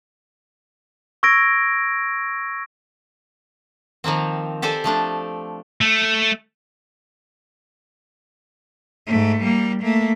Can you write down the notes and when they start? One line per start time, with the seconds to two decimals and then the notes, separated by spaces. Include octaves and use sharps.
1.23 C#6 E6 G#6 A#6 D7
4.04 D#3 F3 A#3 C4
4.62 G4 A4 C5 D5 G#5
4.84 F3 A3 D4 D5
5.81 A3
9.07 G#2 A3
9.41 G3 A#3
9.82 A3 A#3